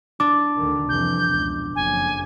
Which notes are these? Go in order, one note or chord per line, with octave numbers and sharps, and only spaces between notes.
D4 D6
D2 D3 D#3
C2 F2 E3 G6
C#2 B2
F#1 F2 C#3 G#5